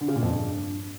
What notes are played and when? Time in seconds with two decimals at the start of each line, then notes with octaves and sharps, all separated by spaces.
0.01 D3
0.08 C#3
0.15 A#2
0.23 F2
0.30 G2